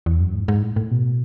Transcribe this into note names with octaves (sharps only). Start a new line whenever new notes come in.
E2
F#2
G#2
G#2
A2
A2
B2